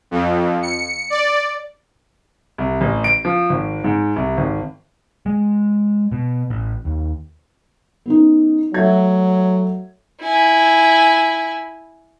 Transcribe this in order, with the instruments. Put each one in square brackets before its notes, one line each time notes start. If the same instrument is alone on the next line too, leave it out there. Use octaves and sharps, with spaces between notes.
[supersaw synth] F2
C#7
D5
[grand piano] C2
A1
D7
F3
G#1
G#2
C2
G#1
[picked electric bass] G#3
B2
A1
D#2
[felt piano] B3 C#4 D#4
[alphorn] F#3 [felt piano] A3 E5 G#6
[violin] E4 G#5